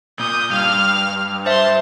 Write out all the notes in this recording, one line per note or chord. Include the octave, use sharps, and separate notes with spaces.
A#2 D#6 G6
G2 F5 F6
C5 E5 A5 C6